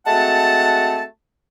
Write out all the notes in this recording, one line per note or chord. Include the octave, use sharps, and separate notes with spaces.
G#3 A3 C4 F#4 F#5 A5